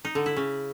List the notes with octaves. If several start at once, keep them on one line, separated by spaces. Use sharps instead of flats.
D#4
D3
E4
C#3